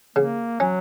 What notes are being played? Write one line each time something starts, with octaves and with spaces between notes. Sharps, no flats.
C#3 A#3
F#3 C#4